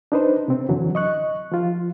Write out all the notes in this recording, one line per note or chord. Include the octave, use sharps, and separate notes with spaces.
D4 D#4 B4 C5
C3 C4
F#2 D3 E3 F#3
D#5 C#6 F#6
F3 F4